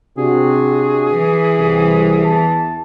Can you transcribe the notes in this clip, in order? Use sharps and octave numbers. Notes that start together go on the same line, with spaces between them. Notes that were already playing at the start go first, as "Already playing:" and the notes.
C3 D4 F#4 G#4
E3
C2
E2 A5